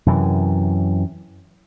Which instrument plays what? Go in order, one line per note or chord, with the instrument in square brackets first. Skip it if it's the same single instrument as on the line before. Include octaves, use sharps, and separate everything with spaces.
[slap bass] F#2 C3 E3